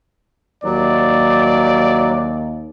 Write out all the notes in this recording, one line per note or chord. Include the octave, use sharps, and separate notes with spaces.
D#2 F#3 D5